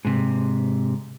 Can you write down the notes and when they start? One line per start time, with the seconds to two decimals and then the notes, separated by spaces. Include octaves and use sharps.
0.05 G#2 C3